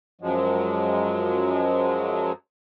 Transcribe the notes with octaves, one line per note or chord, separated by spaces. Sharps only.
F#2 F3 F#3 G#3